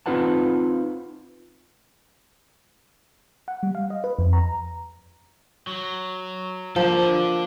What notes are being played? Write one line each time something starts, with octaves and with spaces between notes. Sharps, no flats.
C4 D#4 F4 B4 F#5 A5
F#5
G3
F5
D#5
B4
F2
A#5
F#3
F3 A#3 D4 A4